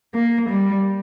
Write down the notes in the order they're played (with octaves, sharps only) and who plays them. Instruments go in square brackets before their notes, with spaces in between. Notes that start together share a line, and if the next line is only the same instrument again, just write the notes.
[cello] A#3
G3